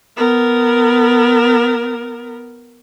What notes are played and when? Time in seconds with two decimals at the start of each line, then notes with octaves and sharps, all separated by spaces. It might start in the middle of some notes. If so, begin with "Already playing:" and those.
0.17 B3 A#4